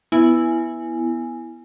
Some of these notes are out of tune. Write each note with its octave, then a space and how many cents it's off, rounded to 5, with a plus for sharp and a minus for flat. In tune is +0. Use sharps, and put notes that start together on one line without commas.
B3 +0 E4 +0 G#5 +0